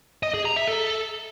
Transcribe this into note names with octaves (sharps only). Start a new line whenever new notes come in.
D#5
G#4
A#5
E5
A4